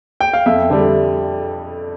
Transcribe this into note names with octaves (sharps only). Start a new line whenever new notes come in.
G5
F5
F2 E5
D3 G3 E5